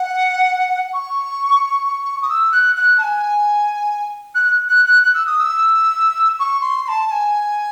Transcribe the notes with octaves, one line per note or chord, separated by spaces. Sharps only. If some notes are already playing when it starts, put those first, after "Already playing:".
Already playing: F#5
C#6
D#6
E6
F#6
F#6
A5
G#5
F#6
F#6
F#6
F#6
E6
D#6
E6
C#6
C6
C6
A5
A5
G#5